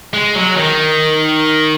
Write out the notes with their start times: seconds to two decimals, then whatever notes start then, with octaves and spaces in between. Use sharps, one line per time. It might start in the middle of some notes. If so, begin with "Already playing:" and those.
0.14 G#3
0.35 F#3
0.57 D#3